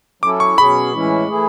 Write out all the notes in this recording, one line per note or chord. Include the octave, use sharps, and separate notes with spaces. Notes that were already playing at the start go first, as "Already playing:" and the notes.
F#3 C#4 E4 A4 D6
C#6
B2 F#3 C#4 G#4 B5
A2 E3 G#3 C#4 E4
E3 A3 E4 G#4